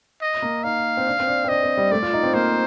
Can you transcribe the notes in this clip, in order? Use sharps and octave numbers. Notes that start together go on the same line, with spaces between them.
D#5
A#3
D#4 F5
C4
D4
C4
D4
C4
D4 D#5
C4
G3
A3 D5
F4
D#4
C4
A#3 C5